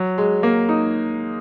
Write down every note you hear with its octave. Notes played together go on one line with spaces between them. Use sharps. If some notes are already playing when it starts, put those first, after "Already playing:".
Already playing: F#3
G#3
A#3
D#4